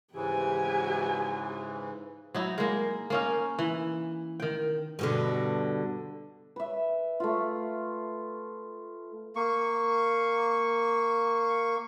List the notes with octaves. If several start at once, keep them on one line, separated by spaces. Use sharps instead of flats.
G#2 C#3 E3 G4 G#5
F#3 D#4 E4
G#3 A#3
A#3 C#4 D#4
E3
D#3 G5
G2 B2 D3
B4 E5
A3 F4
A#3 C#6